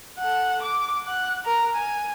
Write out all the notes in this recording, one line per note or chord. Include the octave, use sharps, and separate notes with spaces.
A4 F#5
D6
F#5 F#6
A#4 A#5
G#5